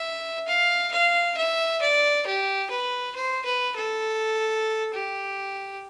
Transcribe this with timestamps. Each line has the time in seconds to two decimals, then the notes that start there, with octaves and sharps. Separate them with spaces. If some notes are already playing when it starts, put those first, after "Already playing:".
Already playing: E5
0.47 F5
0.92 F5
1.37 E5
1.82 D5
2.26 G4
2.71 B4
3.15 C5
3.45 B4
3.76 A4
4.94 G4